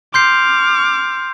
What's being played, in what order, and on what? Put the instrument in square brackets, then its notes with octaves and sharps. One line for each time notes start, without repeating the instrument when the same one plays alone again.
[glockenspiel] C6 G6 C7 [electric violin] D6 F6